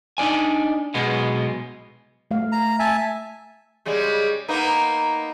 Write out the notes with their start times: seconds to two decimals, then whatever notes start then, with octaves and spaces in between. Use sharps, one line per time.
0.18 D4 D#4 D5 G#5
0.94 B1 B2 G#3 B3
2.31 A3 F5
2.52 A#5
2.79 E5 G#5 A5
3.85 C#3 G3 G#3
4.48 A#3 B3 D#4